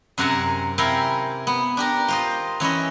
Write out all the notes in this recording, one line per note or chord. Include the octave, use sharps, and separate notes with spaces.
F#2 C3 A#4 F#5 G#5 A5
C3 E4 A#4 F5 G5 G#5
B3
D4 G4 A#4
F4 C5 D#5
E3 C#4 E4 D#5